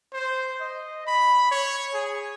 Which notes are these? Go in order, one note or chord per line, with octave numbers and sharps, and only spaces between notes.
C5
D#5
B5
C#5
G#4